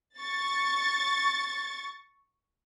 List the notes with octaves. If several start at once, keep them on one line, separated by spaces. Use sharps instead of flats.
C#6 A6